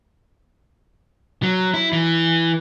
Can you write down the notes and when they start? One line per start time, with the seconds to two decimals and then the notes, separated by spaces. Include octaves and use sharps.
1.43 F#3
1.74 E4
1.93 E3